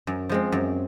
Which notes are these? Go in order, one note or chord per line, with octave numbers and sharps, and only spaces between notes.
F#2
F3 G#3 C4
F#2